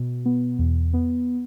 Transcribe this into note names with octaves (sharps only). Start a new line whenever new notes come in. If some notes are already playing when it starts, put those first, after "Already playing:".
Already playing: B2
B3
E2
B3